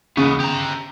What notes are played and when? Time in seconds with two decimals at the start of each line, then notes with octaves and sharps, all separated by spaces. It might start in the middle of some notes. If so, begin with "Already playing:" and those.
0.17 D#2 C#3 B3
0.40 G4 A#5